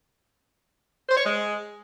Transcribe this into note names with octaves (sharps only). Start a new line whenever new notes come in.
C5
C#5
G#3